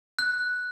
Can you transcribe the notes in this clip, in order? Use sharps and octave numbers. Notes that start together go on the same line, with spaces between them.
F#6